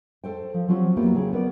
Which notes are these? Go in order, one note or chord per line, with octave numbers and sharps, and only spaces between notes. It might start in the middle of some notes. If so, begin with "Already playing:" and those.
A4 C5 G5
F3
F3 F#3 C4 F4 G4
F#3 A#3 B3 E4 G4
C#3 G#4 G5
B3 A#4 D5